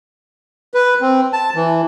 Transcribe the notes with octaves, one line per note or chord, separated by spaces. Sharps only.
B4
C4
A5
E3